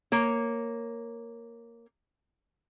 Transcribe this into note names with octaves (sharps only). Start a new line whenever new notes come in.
A#3 C#5